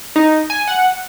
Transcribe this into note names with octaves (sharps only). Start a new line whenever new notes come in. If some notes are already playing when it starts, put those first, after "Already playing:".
D#4
G#5
F#5